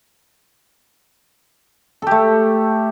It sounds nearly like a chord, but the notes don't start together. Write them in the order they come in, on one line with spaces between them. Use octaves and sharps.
A4 G4 A3